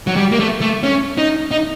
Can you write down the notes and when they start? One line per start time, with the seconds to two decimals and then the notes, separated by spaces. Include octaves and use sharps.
0.07 F#3
0.17 G3
0.32 A#3
0.40 A3
0.61 A3
0.83 C#4
1.18 D#4
1.51 D#4